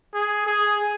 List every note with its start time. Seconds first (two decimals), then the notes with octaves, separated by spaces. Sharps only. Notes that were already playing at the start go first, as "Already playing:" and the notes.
0.14 G#4
0.47 G#4